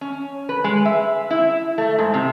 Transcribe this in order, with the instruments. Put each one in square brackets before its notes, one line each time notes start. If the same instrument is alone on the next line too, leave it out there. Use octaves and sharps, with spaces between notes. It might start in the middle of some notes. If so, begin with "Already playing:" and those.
[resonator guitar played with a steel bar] C#4
B4
G#3
E5
E4
A3
G#2
C3